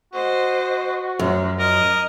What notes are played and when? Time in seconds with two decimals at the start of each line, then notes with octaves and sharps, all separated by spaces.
0.13 F#4 C5 D#5
1.19 F#2 F3
1.59 A#4 D#5